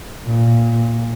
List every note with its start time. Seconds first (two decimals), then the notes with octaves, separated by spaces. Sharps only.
0.25 A#2